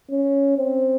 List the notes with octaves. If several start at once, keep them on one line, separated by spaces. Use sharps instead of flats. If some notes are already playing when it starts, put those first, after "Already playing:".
C#4
C4